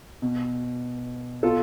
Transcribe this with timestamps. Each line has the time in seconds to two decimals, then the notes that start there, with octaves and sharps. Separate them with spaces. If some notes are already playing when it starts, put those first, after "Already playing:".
0.22 B2
1.43 B2 F4 A4